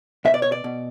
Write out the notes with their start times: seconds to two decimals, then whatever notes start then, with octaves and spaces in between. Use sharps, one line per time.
0.25 B2 E5
0.34 D5
0.42 C#5
0.52 D5
0.64 B2